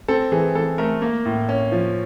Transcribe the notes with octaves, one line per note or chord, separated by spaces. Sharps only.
C4 A4
E3 G#4
E3 A4
A3 A#4
A#3
A2
C#4
F3